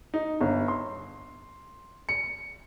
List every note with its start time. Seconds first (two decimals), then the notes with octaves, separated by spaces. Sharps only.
0.14 D#4
0.41 G1
0.68 C6
2.09 C#7